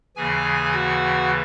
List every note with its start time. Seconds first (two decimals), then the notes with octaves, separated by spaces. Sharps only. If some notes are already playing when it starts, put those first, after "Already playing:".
0.16 D#2 C#3 E3 G#4 G#5
0.72 F#4 F#5